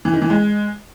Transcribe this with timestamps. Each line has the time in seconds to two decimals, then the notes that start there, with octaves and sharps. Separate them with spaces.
0.05 E3
0.13 D#3
0.22 E3
0.30 G#3